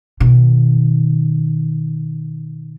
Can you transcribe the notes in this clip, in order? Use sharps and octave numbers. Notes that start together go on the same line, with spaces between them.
B2 D#3